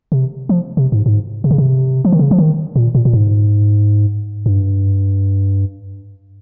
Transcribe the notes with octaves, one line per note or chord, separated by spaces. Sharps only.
C3
F3
C3
G#2
G#2
C3
C#3
C3
F3
D#3
C#3
F3
D#3
A#2
A#2
A#2
G#2
G2